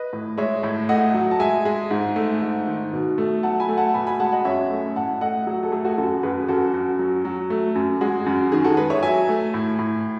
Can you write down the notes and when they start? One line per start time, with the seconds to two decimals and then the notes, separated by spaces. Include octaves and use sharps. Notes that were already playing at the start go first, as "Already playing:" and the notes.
Already playing: B4 D#5
0.13 A2
0.38 G#3 C#5 E5
0.63 A2
0.89 A3 D#5 F#5
1.14 F#3
1.31 A5
1.40 G#3 E5 G#5
1.65 G#3
1.91 G#2
2.16 A3
2.42 G#2
2.67 D#3
2.93 B2
3.18 A3
3.43 F#3 F#5 A5
3.60 G#5 B5
3.69 A3
3.77 F#5 A5
3.94 B2 G#5 B5
4.07 G#5 B5
4.20 G#3 F#5 A5
4.32 D#5 F#5
4.45 F#2 C#5 E5
4.70 A3
4.96 A2 F#5 A5
5.21 A3 D#5 F#5
5.47 F#3 G#4
5.63 A4
5.72 A3 G#4
5.84 F#4 A4
5.98 F#2 F#4 A4
6.23 F#2 G#4 B4
6.48 F#2 F#4 A4
6.74 F#2
6.99 F#3
7.25 F#3
7.50 A3
7.75 F#2
8.01 G#3 F#4
8.26 F#2
8.52 D#3 G#4
8.64 F#4 A4
8.77 G#3 G#4 B4
8.90 C#5 E5
9.03 F#3 E5 G#5
9.29 A3
9.54 A2
9.79 A2